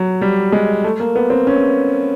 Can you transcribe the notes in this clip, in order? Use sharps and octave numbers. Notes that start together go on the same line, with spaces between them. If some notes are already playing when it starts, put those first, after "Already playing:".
Already playing: F#3
G3
G#3
A3
A#3
B3
C4
C#4